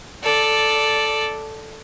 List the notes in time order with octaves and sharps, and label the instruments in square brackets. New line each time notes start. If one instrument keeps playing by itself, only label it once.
[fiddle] A4 D5